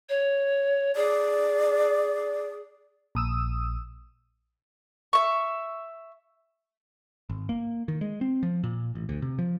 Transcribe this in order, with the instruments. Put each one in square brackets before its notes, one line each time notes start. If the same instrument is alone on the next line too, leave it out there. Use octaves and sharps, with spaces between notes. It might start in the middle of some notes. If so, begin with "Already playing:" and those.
[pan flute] C#5
[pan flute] G#4 [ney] D5
[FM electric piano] A#1 D#6 E6
[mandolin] E5 C#6
[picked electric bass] G#1
A#3
D#3
G#3
C4
F3
A#2
A1
D2
C3
F3